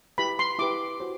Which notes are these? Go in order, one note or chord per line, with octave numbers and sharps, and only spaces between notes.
E4 G4 B4 B5
C6
E4 G4 B4 D6
F#4 C5